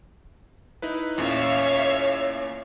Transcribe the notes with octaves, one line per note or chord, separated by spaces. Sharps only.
D#4 E4 B4
E2 A#2 C#4 C#5 E5 F5